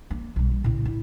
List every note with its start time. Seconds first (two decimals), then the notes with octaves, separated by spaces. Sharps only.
0.10 A#3
0.36 B1 G3
0.51 G3
0.64 A2 C#3
0.85 E4